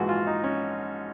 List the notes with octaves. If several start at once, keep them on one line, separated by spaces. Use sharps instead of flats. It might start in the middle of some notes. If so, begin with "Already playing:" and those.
Already playing: A#1 G#2 E3 G#3 F#4
F4
D#4
C#4